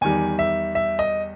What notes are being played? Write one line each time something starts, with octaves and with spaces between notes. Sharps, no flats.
E2 D#3 G3 G#5
E5
E5
D#5